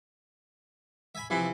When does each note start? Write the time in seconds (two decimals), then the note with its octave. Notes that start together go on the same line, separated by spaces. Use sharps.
1.15 E5 G#5 B5
1.30 C3 E3 F3